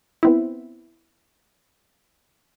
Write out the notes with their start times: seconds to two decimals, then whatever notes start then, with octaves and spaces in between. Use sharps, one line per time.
0.23 B3 C4 E4